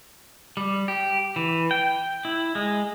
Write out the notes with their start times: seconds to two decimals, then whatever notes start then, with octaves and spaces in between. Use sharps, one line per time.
0.57 G3
0.88 G4
1.36 E3
1.71 G5
2.25 E4
2.55 G#3